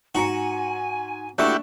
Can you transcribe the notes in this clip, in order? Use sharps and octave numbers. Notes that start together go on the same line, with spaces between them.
G#2 F#4 G#5 A#5 C#7
A3 D4 E4 F#4 G4 C#6 E7